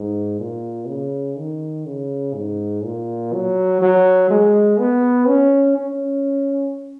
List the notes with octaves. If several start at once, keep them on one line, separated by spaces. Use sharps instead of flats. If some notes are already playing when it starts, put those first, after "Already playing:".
Already playing: G#2
A#2
C#3
D#3
C#3
G#2
A#2
F#3
F#3
G#3
B3
C#4
C#4